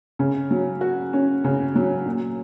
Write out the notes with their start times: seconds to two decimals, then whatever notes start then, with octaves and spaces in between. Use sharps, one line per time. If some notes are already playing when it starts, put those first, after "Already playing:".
0.19 C#3
0.51 F#3
0.81 F#4
1.13 C#4
1.44 C#3
1.75 F#3
2.06 A#2